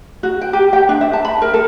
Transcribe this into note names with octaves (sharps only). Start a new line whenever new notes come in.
F#4
G5
G4
G5
D4
E5
A5
B5
A#4
A4